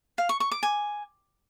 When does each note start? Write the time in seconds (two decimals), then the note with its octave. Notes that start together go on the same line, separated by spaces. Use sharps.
0.18 F5
0.29 C#6
0.40 C#6
0.51 D6
0.63 G#5